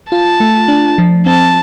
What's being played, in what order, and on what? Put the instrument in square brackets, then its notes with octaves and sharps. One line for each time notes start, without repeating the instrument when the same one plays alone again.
[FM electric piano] F4 [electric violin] A5
[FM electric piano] A3
D4
F3
[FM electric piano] C4 [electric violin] A5